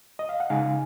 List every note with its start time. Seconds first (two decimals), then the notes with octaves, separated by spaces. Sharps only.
0.19 D#5
0.29 F5
0.40 F#5
0.50 C#3 G#3 D#4 F5 G#5